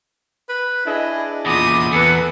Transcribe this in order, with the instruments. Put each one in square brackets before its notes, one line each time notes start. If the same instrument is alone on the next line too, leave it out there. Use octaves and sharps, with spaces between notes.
[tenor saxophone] B4
[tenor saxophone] D4 [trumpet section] E4 G#4 D#5
[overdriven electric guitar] E2 A#2 [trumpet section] E4 B5 D#6 [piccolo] D6
[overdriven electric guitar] E2 [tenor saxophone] A4 [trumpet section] B4 [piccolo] C#7